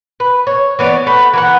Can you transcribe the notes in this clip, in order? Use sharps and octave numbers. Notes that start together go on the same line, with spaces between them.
B4
C#5
E3 B3 C#5 D5
A3 B4 F#5
E3 A#4 F#5